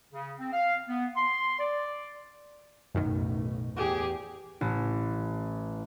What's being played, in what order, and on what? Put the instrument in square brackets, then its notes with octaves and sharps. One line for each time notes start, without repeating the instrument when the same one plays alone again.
[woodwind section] C#3
C4
F5
B3
C6
D5
[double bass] B1 A2 [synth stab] F#2 D#3
[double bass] E2 [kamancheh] G4 G#4
[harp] A1